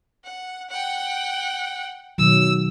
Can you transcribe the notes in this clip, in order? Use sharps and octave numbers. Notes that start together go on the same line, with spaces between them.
F#5
F#5 G5
B2 D#3 F#3 E6